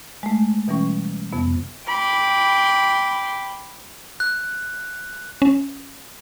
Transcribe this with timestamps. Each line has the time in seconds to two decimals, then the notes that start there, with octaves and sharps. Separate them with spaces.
0.23 G#3 A3
0.68 B2 E3 G3 C#4 C#6
1.33 F2 C3 B3
1.87 G5 B5 C6 D6
4.20 F#6
5.42 C#4